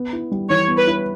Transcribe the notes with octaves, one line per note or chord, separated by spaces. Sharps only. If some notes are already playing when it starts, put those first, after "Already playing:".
Already playing: B3
E4
G3
E3 C#5
B3
B4
E4